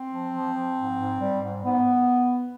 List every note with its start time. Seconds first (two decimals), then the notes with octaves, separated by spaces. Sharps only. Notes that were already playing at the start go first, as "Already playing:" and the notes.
Already playing: C4
0.12 F3
0.35 F3
0.56 F3
0.78 G#2
0.99 G#2
1.21 G3
1.42 G#2
1.63 G#2 B3